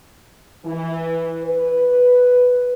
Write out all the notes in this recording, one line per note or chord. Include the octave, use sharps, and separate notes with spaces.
E3
B4